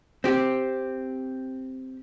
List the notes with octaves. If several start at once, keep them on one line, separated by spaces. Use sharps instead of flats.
C4 G4